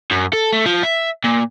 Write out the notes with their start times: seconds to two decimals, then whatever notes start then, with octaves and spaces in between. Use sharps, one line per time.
0.11 F#2
0.33 A4
0.53 A3
0.66 F3
0.84 E5
1.24 A#2